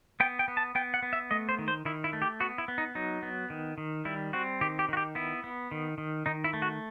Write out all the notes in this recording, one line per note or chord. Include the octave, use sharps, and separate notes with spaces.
B3 G5
G5
B3
A5
B3 G5
F#5
B3
E5
A3 D#5
C5
D#3
C5
D#3 E4
E4
A3
G4
B3 F#4
E4
B3
D#4
F#3 D#4
B3
D#3
D#3
G3 E4
C4 F#4
D#3 G4
G4
D#3 F#4
G4
B3 E4
B3
D#3
D#3
D#3 D#4
E4
A3
F#4